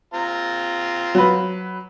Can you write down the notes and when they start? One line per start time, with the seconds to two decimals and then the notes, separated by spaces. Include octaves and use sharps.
0.14 C4 F4 A#5
1.15 F#3 B4